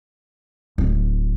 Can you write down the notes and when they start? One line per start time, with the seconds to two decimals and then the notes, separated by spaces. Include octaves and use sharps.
0.78 D1